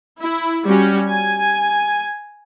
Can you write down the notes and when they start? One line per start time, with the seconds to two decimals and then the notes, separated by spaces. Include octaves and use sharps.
0.21 E4
0.66 G3 C#4 F#4
1.09 G#5